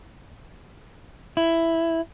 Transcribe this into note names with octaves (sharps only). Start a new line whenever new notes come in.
E4